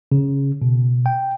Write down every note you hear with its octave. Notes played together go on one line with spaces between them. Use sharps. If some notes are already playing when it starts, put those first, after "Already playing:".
C#3
B2
G5